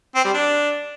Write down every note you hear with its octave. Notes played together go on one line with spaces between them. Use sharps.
C4
G3
D4